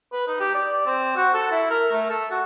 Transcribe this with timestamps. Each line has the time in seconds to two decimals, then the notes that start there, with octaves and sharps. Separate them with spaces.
0.13 B4
0.27 D#4
0.40 G4
0.54 D5
0.86 C4
1.16 F#4
1.34 A4
1.51 E4
1.71 A#4
1.92 A3
2.10 A4
2.31 F#4